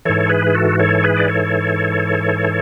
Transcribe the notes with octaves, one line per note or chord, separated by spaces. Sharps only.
G#2 E3 A4 C#5
G#4 B4
G#4
F#4 A4
A4 C#5
G#4 B4
D5
A4 C#5